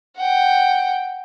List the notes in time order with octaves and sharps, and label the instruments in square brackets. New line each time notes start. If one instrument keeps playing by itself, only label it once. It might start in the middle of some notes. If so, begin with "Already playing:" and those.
[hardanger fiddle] F#5 G5